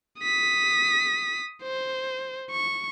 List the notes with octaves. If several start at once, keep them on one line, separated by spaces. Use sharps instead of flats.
D#6 B6
C5
C#6